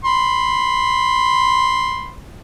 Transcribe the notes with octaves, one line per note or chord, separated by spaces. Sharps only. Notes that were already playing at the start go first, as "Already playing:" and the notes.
B5 C6